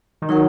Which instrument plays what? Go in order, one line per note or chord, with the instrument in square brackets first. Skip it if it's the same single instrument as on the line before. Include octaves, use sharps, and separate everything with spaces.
[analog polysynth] D#3
[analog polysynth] F#3 [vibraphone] D#4 A#4 F#5